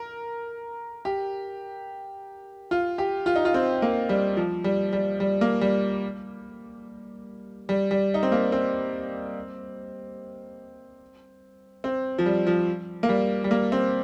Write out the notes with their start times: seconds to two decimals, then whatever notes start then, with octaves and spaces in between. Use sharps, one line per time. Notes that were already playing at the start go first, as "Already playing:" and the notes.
Already playing: A#4
1.05 G4
2.71 F4
2.98 G4
3.26 F4
3.36 D#4
3.45 F4
3.54 C4
3.82 A#3
4.09 G3
4.37 F3
4.64 G3
4.93 G3
5.20 G3
5.41 A#3
5.61 G3
7.69 G3
7.91 G3
8.14 D#4
8.23 C4
8.32 A#3
8.52 C4
11.84 C4
12.18 F3
12.26 G3
12.47 F3
13.03 A#3
13.09 G3
13.44 G3
13.51 A#3
13.72 C4